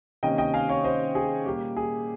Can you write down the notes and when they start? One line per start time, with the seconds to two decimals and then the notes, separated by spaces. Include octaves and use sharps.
0.23 C3 D#3 A#3 C#4 D#5 G5
0.38 D#5 G5
0.54 F5 G#5
0.69 C#5 F5
0.84 C5 D#5
1.15 G#4
1.46 A#2 G3 A#3 G4
1.77 G#4